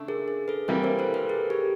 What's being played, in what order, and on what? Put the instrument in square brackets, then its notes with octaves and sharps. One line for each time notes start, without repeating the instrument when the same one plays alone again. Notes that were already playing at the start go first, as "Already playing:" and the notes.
Already playing: [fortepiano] C#3 A3 D4
[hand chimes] G#4 A#4
G#4
A4 B4
[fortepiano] C3 E3 G3 A#3 [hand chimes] A4 B4
[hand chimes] A#4 C5
A#4 C5
A4 B4
G#4 A#4
G4 A4